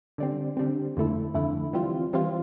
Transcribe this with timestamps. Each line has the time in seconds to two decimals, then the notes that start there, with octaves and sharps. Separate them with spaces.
0.18 D3 G3 C4
0.57 D3 G3 C4
0.97 F2 D3 A3 E4
1.34 F2 D3 A3 E4
1.73 E3 G3 C4 F4
2.13 E3 G3 C4 F4